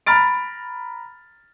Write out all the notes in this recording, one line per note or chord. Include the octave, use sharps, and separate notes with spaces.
A#5 B5 F6 A6 D7